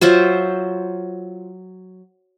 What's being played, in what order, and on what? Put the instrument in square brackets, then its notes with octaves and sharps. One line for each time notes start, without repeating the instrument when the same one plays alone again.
[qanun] F#3 F4 C5 E5